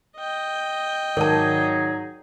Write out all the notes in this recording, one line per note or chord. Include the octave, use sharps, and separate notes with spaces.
D#5 G5
G#2 D#3 F#3 D#4 G#4 A#4 D5 A5